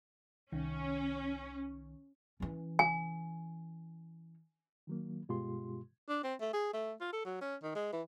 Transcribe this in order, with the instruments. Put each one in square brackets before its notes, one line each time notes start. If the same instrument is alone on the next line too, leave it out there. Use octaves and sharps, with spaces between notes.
[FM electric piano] C2 D#3 [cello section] C#4
[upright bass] E3 C#4
[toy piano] G#5
[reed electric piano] D#3 F#3 A#3
G2 B2 G#3 F4 G4 C6
[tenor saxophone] D4
C4
A3
G#4
A3
F4
A4
F#3
C#4
D#3
G#3
E3